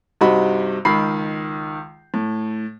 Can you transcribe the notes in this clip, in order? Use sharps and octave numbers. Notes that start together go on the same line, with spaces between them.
G2 C3 D#4 F#4 B5
C#2 D#3 B5 C7
A2